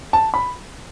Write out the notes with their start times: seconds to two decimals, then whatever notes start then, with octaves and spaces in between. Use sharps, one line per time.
0.13 A5
0.34 B5